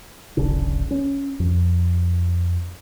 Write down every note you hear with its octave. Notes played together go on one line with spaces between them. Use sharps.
D1 G#1 C#3 D4
C#4
F2